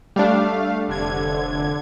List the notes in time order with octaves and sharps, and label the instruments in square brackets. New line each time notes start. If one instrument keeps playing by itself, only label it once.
[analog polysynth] G3 D4 [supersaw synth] A3 F5
[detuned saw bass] F1 [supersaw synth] D3 G#6